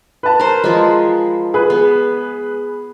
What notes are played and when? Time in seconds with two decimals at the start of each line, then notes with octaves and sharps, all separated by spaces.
0.23 B4 A5
0.40 A#4 C5
0.64 F3 G#3
1.54 G#4 B4
1.70 B3